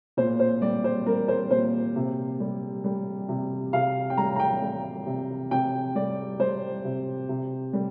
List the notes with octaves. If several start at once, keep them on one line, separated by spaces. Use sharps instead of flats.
A#2 C5
C5
G3 D5
C5
G3 A#4
C5
A#2 C5
C3
G3
G3
C3
C3 F5
G5
G3 A#5
A#5
G5
G3
C3
C3 G5
G3 D5
G3 C5
C3
C3
G3